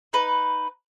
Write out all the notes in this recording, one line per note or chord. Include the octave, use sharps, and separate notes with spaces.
D#4 B4